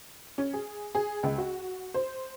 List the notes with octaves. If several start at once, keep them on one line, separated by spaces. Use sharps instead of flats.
C#4
G#4
G#4
C#2
F#4
C5